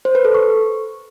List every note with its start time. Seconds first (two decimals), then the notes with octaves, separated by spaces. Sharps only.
0.05 C5
0.15 B4
0.25 A4
0.34 C#6